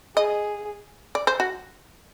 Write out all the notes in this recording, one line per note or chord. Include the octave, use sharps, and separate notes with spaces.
G#4 D#5
D5
C5
F#4